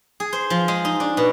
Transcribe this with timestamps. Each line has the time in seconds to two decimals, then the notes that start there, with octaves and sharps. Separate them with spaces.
0.20 G#4
0.33 C5
0.50 F3
0.68 G#3
0.85 D#4
1.00 D4
1.17 B2